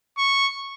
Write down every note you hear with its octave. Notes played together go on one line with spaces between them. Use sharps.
C#6